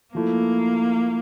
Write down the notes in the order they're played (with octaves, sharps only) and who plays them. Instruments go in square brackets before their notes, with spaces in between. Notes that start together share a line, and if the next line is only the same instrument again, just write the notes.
[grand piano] F3 A3 E4 [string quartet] A#3